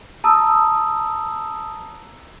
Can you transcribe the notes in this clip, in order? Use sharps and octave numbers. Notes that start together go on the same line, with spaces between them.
A5 A#5 D#6 E6